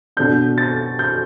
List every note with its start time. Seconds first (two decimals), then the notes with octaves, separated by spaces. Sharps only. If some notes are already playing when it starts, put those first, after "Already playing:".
0.17 B2 B3 D4 G6
0.58 A6
0.99 G6